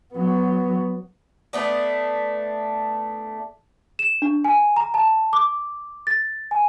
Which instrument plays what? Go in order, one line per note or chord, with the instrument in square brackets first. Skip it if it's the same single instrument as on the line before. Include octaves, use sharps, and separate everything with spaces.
[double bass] F#3 B3
[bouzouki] A3 B3 D4
[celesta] E7
D4
G#5
A#5
A5
D6
A6
G#5